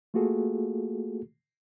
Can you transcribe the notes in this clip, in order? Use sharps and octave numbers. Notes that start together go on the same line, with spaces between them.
A3 A#3 F4 F#4 G#4 A4